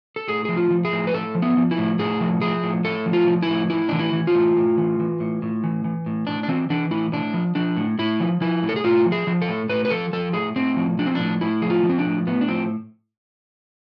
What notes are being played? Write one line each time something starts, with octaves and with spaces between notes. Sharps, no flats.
A4
A2 G#4
F3 G#4
F4
F3
G#4
A2
B4
A2 A4
F3
B3
F3
E4
A2
A2 G#4
F3
F3 G#4
A2
A2 A4
F3
F4
F3
E4
A2
A2 E4
E3 D4
E4
E3
F4
A2
A2
E3
E3
A2
A2
E3
E3
A2
A2 D4
D4
E3 C4
E3 D4
A2 E4
A2 D4
F3
F3 D4
A2
A2 E4
F3
F3 E4
A2
A4
G#4
A2 F4
F3
G#4
F3
A4
A2
A2 B4
B4
F3 A4
F3 A4
A2 G#4
A2 C4
F3
F3 D4
C4
A2 D4
A2 E4
F3 G#4
F4
F3
C4
D4
A2
A2 B3
D4
F3 C4